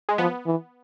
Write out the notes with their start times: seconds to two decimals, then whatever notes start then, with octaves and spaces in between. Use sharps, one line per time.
0.09 G#3
0.18 F3 B3
0.46 E3